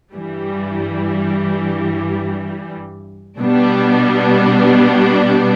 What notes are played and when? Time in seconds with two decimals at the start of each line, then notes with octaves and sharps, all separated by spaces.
0.14 G2 E3 G3
3.39 B2 G3 B3 D4